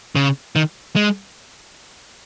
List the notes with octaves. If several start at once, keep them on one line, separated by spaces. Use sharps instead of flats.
C#3
D#3
G#3